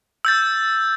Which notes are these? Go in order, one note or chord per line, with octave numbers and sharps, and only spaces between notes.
E6 G6 A6